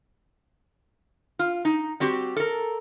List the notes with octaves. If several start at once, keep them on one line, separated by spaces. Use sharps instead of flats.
F4
D#4
G3 C4 F#4 G4
A4 A#4